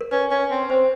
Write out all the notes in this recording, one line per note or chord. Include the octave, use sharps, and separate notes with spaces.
A#4
C#4 B4
C#4
C4
C4 C5